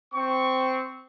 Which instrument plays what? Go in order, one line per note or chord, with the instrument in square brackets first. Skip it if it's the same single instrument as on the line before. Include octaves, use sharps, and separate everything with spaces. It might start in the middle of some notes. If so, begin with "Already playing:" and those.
[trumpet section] C4 C#6